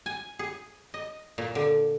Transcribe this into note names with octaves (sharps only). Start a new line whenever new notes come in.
G#5
G#4
D#5
A#2
D3